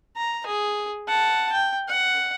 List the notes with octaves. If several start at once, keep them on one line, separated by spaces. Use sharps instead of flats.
A#5
G#4
F#5 A5
G5
F#5